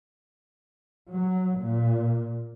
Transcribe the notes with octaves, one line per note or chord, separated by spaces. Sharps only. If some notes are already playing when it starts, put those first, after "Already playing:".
F#3
A#2